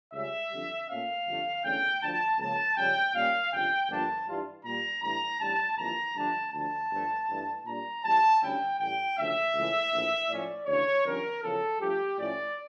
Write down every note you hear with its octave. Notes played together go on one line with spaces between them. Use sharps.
C#2 C#3 G3 C#4 E5
F2 D3 G3
A#2 A3 C#4 F5
G1 F2 D3 A3
E2 D3 A3 C#4 G5
D2 D3 F3 A5
C#2 C#3 F3 A#3 A5
F2 C#3 G3 C#4 G5
A#2 G3 A#3 C#4 F5
G1 F2 C#3 G5
G1 G2 F3 A#3 D4 A5
G2 E3 G3 D4 F4
A#2 G3 A#3 A#5
A2 E3 G3 D4 A#5
A1 A2 G3 D4 A5
G1 F2 E3 A#3 A#5
G2 D3 F3 A3 D4 A5
D2 D3 F3 A5
G1 G2 F3 A3
G2 E3 A3
A#2 G3 D4 A#5
E2 E3 G3 A5
D2 D3 G3 C#4 E4 G5
A1 A2 G3 G5
D2 C#3 F3 A3 E5
C#2 C#3 E3 A3
A#1 A2 E3
A2 F3 C#4 D5
D2 C#3 E3 C#5
F2 D3 G3 C#4 A#4
E2 C#3 F3 A4
G2 F3 A3 G4
A2 F3 C#4 E4 D5